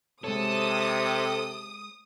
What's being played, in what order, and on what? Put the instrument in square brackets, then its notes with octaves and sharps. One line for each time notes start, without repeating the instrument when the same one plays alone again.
[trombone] C3 [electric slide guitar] G#3 C5 C#5 [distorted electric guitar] A4 [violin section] D#6